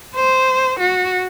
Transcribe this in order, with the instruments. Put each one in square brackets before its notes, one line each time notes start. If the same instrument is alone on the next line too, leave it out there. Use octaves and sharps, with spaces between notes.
[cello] C5
F#4